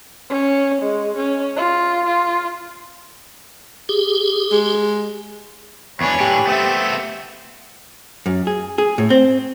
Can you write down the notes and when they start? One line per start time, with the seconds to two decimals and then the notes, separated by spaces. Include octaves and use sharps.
0.30 C#4
0.82 G#3
1.16 C#4
1.56 F4
2.05 F4
3.89 G4 G#4
4.52 G#3
6.01 E2 D4 B4 C#5 G#5
6.20 A2 D4 G4
6.47 A3 B3 C4 E5
8.26 F#2
8.47 G#4
8.78 G#4
8.98 A2
9.10 C4